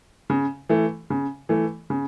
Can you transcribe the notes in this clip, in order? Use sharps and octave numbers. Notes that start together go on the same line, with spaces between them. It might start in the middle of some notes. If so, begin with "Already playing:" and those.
C#3
E3 A3
C#3
E3 A3
C#3